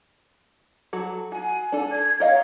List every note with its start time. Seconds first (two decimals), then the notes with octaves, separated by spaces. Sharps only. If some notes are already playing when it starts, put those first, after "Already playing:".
0.93 F#3 F#4 A4
1.32 F#4 G#5
1.72 D4 A4
1.92 G#6
2.20 A#4 C#5 D#5 F5